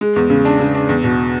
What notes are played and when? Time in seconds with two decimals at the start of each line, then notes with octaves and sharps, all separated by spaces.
0.01 G#3
0.16 E2
0.30 C#3
0.45 D4
0.60 C#3
0.75 D4
0.89 E2
1.04 B2